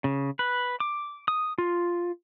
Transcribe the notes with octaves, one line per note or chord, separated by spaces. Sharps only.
C#3
B4
D6
D#6
F4